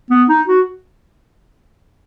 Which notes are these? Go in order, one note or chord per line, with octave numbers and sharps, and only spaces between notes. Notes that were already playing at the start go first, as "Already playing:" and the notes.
B3
D#4
F#4